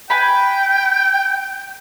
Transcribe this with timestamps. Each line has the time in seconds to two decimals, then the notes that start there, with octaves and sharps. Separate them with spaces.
0.10 B4 G5 G#5 B5